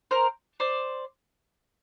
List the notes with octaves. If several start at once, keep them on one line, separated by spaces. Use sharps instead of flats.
A#4 C5
C5 D5